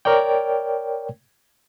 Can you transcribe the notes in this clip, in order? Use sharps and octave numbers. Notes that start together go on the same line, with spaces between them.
A#4 C#5 D5 G5